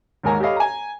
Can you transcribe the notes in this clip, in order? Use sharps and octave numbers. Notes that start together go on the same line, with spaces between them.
D#2 G#2 A#4 C#5 G#5 A#5
G4 A4 C#5 D#5 F5 B5
G#5 A#5